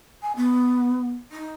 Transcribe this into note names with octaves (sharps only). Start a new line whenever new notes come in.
G#5
B3
D#4